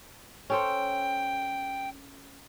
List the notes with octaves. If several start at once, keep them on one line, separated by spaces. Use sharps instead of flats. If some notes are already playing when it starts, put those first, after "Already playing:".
C#4 A4 C5 G5